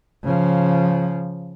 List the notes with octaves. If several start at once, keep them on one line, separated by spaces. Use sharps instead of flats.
C#3 F3